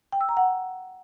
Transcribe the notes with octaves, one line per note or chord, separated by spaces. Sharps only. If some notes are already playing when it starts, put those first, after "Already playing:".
G5
E6
A#5
F#5